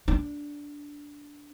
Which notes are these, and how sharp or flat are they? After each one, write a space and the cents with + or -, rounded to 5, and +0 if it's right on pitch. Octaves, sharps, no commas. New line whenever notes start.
D4 -10